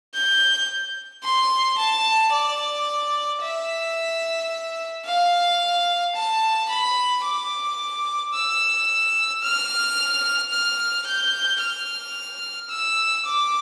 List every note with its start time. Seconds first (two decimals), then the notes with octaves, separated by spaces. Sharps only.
0.15 G6
1.24 C6
1.79 A5
2.33 D5
3.42 E5
5.06 F5
6.16 A5
6.69 B5
7.24 D6
8.34 E6
9.43 F6
10.52 F6
11.07 G6
11.61 F6
12.70 E6
13.25 D6